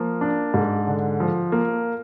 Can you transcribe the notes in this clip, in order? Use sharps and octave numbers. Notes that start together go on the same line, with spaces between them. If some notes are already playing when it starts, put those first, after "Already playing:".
Already playing: F3 A#3
D4
G#2
D3
F3
A#3